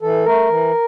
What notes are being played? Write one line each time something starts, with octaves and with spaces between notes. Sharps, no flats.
E3 A4
A3 A#4
E3